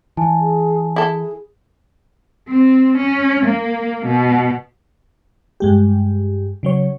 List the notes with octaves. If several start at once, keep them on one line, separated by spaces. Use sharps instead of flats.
E3 G#5 A5
G#4
E4 G#4 A4
C4
C#4
A#3
B2
G2 G#3 G4
C#3 F#3 C#5